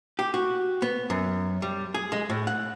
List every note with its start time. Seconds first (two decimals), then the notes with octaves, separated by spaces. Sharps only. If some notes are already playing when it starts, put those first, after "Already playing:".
0.19 G4
0.34 F#4
0.82 B3
1.10 F#2
1.62 G3
1.94 G#4
2.12 G#3
2.30 A2
2.47 F#5